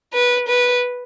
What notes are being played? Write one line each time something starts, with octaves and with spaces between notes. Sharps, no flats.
B4
B4